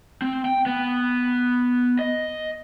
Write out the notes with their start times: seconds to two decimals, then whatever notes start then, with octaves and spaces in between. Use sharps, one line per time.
0.22 C4
0.45 G5
0.66 B3
1.99 D#5